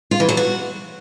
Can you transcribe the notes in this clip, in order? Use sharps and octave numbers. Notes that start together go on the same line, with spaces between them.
F4
E3
F#3
F#4